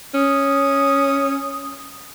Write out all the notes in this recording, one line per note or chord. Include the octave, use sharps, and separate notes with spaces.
C#4 D#6